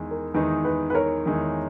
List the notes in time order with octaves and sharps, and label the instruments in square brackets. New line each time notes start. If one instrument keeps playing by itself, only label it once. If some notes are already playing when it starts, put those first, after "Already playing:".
Already playing: [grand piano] E2 D#3 G#3 D#4
[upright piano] A#4
[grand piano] E2 D#3 G#3 D#4 [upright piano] B4
[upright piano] B4
B4
A#4 C#5
[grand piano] E2 D#3 G#3 D#4